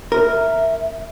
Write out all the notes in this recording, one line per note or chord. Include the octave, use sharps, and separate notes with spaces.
A#4 E5